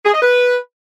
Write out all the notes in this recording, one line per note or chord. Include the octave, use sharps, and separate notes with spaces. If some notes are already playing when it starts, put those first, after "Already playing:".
G#4
D#5
B4